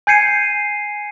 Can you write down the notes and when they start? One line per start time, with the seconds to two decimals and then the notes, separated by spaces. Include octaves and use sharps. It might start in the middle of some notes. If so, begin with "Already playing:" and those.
0.07 G#5 G6 G#6 C7 C#7 D#7